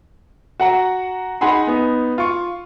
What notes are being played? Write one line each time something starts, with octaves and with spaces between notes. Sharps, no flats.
F#4 F#5 A#5
D#4 G#4 F#5 G#5 B5 C6
B3 D#4
F4 C#6